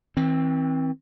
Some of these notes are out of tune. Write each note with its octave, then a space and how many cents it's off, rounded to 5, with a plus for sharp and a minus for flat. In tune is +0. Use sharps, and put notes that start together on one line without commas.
E3 -40 C4 +10